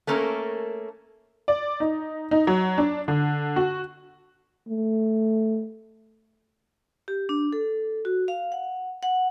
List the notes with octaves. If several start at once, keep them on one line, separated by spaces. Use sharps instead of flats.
A3 A#3 C#4 A4 A#4
D5
D#4
D#4
F#3
D4
D3
F#4
A3
G4
D4
A4
F#4
F5
F#5
F#5